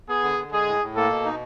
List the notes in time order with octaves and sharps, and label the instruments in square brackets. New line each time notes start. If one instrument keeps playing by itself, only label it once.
[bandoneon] B3 [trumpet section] G#4
[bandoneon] D3
D3
[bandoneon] G#3 [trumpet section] G#4
[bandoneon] A2
A2
[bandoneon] A#3 [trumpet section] A4
[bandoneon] B2
D#4